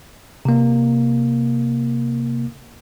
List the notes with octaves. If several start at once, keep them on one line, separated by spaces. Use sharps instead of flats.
C3 A#3